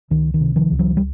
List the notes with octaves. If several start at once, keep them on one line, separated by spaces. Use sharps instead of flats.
C#2 D#3
D#3
C3
D#3 F3
C#2
E3 F#3
G3